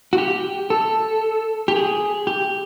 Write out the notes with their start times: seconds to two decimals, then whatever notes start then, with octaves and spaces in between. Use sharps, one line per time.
0.13 F#4
0.18 G4
0.70 A4
1.68 G4
1.76 G#4
2.27 G4